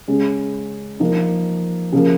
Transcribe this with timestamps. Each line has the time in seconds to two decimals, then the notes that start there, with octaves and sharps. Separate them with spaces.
0.08 C#3 G#3 C#4
1.00 F3 A#3 D#4
1.92 C#3 F3 A#3